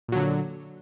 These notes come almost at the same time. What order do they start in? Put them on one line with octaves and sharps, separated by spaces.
A#2 F#3 D3